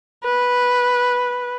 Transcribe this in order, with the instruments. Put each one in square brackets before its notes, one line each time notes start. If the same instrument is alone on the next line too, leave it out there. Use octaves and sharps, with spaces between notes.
[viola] B4